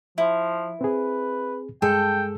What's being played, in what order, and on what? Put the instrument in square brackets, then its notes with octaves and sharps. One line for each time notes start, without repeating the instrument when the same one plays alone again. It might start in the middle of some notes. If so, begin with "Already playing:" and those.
[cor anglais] F3 [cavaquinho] E4
[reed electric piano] C4 G#4 [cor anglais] B4
[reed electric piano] G2 G#3 G#4 [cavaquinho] A4 [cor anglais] G5